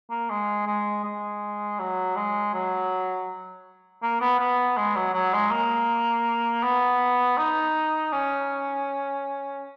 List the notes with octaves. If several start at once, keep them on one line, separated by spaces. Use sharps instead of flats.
A#3
G#3
G#3
G#3
F#3
G#3
F#3
A#3
B3
B3
G#3
F#3
F#3
G#3
A#3
B3
D#4
C#4